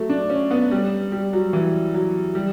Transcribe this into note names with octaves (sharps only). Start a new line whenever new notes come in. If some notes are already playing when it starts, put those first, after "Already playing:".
Already playing: F#3 A3
D4
C#4
B3
G3
G3
F#3
E3
F#3
G3